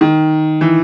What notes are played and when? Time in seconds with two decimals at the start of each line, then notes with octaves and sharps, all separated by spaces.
0.01 D#3
0.61 E3